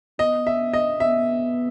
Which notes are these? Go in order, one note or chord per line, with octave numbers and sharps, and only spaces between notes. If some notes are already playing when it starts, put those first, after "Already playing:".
B3 D#5
E5
D#5
B3 E5